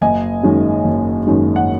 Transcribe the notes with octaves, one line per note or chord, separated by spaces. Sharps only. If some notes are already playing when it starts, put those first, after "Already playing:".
F#1 D#5 G#5
F#2 D#3 G#3
F#1
F#2 D#3 G#3
F#5